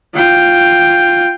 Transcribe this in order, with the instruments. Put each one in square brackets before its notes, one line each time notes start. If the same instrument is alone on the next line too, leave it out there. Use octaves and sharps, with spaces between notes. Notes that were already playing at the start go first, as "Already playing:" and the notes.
[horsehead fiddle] F4 G5